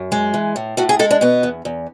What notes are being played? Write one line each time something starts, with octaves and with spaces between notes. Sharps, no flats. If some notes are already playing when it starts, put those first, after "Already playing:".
Already playing: F#2
G#3
E3
A2
A2 F#4
G#4
G#3 A4
D4
B2 B3
E2
E2